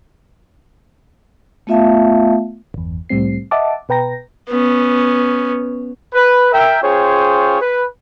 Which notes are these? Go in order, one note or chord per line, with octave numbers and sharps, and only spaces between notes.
A3 B3 F4 E5 F5 A5
G1 E2
C2 A2 G3 C4 C7
D#5 E5 F#5 A5 D6
B2 B4 G5 A#5 A#6
B3 C#4
B4
A#4 E5 G5
C#4 F4 G#4 C5 C#5 G5
B4